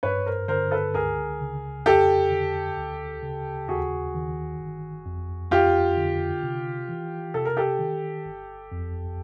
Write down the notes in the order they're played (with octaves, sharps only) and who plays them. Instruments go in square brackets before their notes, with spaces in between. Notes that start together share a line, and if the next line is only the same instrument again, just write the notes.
[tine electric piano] G2 [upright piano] B4 C#5
[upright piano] A#4 C5
[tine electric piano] D3 [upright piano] A#4 C5
[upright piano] A4 B4
[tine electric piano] C#2 [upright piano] G#4 A#4
[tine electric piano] C#3
[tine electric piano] F2 [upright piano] G4 A4
[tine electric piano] D3
D2
C#3
[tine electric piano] D#2 [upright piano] F#4 G#4
[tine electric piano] D#3
G1
F2
[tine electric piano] F2 [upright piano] F4 G4
[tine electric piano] D3
C3
E3
[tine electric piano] C3 [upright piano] A4
[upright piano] A#4
G4 A4
[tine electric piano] D#3
G1
F2